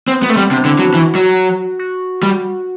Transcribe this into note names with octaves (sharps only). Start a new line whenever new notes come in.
B3 C4
B3
A3 C4
G3
C3 D4
D3 E4
F#3 F#4
E3
F#3
F#4
G3